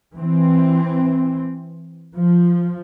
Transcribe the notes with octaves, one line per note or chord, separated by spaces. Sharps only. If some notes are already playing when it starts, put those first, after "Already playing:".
E3 C4
F3